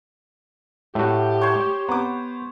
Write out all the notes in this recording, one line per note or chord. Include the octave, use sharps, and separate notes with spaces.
A2 A3 F#4 G4
C5 C#5
B3 A#5 D6